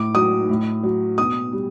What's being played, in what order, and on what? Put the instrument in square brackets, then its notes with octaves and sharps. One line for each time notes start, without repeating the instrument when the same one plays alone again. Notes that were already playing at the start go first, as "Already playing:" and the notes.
Already playing: [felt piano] A2 D6
F#3 D#6
A2
F#3
B2 D#6
G3